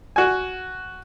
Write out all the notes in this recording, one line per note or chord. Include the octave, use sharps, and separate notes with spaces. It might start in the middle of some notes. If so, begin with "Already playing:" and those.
F#4 G#5